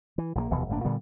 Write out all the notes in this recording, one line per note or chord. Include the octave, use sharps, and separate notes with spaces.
E3
A#1 F3 A#3
F1 D#2 B2 E3
G1 A2 A#3 D4
A#2 D3 G3 B3